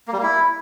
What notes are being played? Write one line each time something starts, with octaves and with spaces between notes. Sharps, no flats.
A#3
G3
A#3
E4